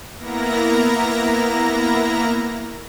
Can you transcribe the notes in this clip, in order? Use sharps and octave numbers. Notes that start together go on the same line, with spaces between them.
A#3 B3 E4 A#4 A#5 A#6